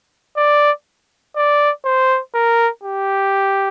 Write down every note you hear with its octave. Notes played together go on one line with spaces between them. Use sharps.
D5
D5
C5
A#4
G4